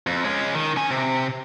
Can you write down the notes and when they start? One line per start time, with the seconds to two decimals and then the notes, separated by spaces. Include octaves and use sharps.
0.07 F2
0.25 G#3 C#4
0.54 D#3
0.76 C#4 G#5
0.91 C3